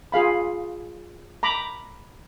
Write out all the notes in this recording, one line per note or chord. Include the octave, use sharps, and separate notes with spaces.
F4 G#4 F5 B5
A#5 B5 D6